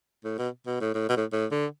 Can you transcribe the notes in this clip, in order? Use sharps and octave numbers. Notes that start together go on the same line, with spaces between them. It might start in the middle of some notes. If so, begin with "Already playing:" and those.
A2
B2
B2
A2
A2
B2
A2
A2
D3